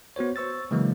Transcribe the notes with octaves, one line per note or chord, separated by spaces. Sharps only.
B3 F#4 C5 C#5
C5 C#6 E6 A6
C#3 E3 F#3 G#3 A#3